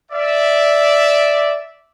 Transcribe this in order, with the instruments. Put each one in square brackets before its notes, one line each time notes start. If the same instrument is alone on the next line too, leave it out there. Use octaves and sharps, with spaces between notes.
[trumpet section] D5 E5